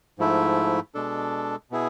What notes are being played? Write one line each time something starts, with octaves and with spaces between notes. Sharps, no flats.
G#2 F3 A3 E4
B2 G#3 D4 A4
B2 B3 E4 G#4